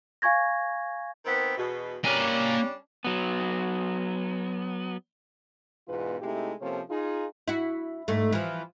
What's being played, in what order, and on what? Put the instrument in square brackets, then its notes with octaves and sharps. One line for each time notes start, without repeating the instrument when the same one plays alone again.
[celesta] F5 G#5 C#6 G#6 A#6
[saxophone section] D#3 B3 C4
E2 B2
[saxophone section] G3 C#4 D4 [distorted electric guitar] A#3 G#5
[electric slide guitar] F#3 B3
[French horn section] E2 G#2 B2 F4 B4
C3 G#3 A3 D#4 E4 G4
C3 F3 A#3 C#4 A4 C5
D#4 F4 G#4
[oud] E4 F#4
G#2 A3
E3 F3